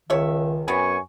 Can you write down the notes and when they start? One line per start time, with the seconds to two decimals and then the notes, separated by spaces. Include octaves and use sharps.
0.10 C#2 D#3 C#5 E5
0.68 F#2 B3 C4 G#5 C#6